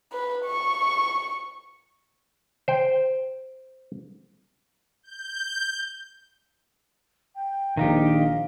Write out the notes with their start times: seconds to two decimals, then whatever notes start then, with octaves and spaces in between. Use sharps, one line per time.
0.12 B4
0.46 C#6
2.68 C5 G5
5.03 G6
7.35 G5
7.77 A#1 D#3 D#4 G4 F5